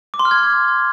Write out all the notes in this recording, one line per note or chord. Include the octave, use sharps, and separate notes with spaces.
D6
C6
F6
G#6